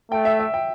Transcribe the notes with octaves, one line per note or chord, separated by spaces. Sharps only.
A3 G5
E5
E5
G5